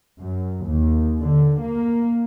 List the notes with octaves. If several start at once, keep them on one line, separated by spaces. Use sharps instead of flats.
F#2
D#2
D3
A#3